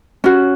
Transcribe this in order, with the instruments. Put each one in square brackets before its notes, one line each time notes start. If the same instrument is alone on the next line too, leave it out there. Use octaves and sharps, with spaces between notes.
[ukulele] C#4 F#4